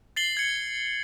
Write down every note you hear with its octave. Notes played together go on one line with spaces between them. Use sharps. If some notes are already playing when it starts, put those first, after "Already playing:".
A6 C7 F#7 G7
G#6 C#7